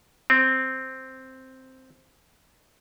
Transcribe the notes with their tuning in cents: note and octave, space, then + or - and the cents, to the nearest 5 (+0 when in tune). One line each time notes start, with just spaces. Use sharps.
C4 +0